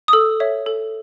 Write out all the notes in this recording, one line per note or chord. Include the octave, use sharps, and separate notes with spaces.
D#6
A4 E6
C#5 E5
A4